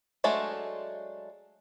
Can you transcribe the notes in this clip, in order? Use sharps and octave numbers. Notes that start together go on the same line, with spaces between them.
F#3 G#3 A3 D4 A4